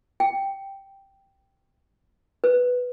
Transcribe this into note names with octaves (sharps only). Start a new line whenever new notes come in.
G5
B4